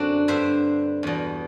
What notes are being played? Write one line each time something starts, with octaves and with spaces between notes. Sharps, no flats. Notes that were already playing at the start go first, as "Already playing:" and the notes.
Already playing: F#2 D3 C4 D4 F#4
G2 D3 C5 E5
E2 B2